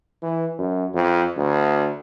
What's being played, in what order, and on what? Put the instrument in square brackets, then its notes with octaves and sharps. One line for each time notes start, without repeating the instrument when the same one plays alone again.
[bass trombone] E3
F#2
F2
D2